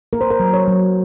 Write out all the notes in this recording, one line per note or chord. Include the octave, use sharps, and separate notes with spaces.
A#3 A#4
C5
A#4
F#3
C#5
F#3